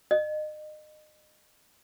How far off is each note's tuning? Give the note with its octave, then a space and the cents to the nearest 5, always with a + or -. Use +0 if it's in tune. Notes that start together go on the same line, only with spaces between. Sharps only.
D#5 -30